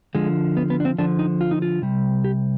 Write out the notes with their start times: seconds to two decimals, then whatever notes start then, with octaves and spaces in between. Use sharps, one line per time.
0.15 D3 F3 G#3
0.57 B3
0.70 B3
0.80 D4
0.85 C4
0.98 D3 F3 D4
1.19 D#4
1.41 F4
1.51 D#4
1.62 F4
1.82 C3 G3
2.24 G4